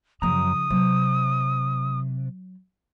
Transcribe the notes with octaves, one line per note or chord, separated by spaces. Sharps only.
F#2 C#3 F3 A#5 D#6
C3 F#3